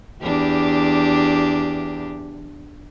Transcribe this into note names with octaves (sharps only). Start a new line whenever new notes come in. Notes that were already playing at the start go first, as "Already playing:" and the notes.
E2 D4 G4